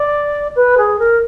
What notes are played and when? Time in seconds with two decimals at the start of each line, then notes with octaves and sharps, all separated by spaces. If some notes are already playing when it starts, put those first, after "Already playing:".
Already playing: D5
0.56 B4
0.78 G#4
0.99 A#4